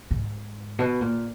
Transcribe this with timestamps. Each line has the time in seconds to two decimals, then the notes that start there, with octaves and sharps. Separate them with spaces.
0.11 G#2
0.79 B2
1.01 A#2